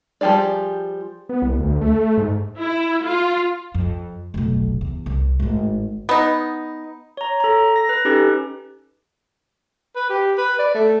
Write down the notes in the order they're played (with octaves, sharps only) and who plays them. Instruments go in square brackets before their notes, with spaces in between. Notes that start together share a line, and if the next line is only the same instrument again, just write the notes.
[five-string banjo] F3 G3 G4 G#4 D5
[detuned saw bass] B3
C2
D2
A3
G#2
[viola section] E4
F4
[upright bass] F2
F1 B1
E2
C2
G#1 A2
[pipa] B3 D#4
[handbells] C#5 A#5
A4 A#5
A#6
B4
C#4 D#4 G4 A4
[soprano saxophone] B4
G4
B4
D5
A3